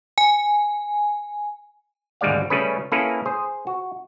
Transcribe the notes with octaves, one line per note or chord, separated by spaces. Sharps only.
G#5
G#1 D2 G3 G#3 D5 F5
C#3 G3 A3 C#4 G#4 B4
A#3 C#4 E4 G#4 A4 B4
G#4 C5
F#4